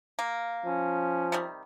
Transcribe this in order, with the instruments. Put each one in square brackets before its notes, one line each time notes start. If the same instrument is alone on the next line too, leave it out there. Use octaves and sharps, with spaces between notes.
[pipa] A#3
[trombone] F3 [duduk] C#4
[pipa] C3 D#3 G3